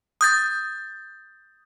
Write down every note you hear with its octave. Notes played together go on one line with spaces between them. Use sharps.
D#6 G6 A6